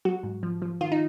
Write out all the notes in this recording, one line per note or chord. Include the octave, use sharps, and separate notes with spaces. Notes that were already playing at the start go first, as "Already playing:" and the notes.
F#3 F#4
G#2
F3
F3
D#3 F4
D#4